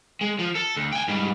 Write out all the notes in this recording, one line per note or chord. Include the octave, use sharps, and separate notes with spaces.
G#3
F3
A4
D2
G5 G#5
G#2 G3